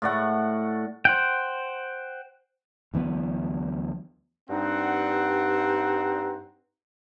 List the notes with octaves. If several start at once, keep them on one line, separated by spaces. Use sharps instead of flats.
A2 D5 F#5 C#6
C5 F#5 G5
D2 E3 F#3 B3
G2 C4 D#4 F#5